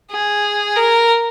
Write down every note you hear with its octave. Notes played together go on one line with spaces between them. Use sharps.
G#4
A#4